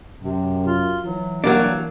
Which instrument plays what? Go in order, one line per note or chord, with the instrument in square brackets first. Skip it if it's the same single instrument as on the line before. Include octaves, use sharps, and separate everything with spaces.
[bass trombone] F#2 [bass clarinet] C3
[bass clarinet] F4
[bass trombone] E3 [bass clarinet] F#3
[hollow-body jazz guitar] F#3 A#3 D4 [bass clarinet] G3